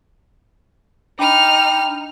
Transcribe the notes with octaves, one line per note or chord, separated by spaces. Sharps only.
D4 D#4 G5 B5 F6